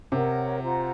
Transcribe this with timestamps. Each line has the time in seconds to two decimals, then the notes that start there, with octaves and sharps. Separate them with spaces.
0.12 C3 A#4 C#5 F#5
0.62 F4 C5 F#5 A#5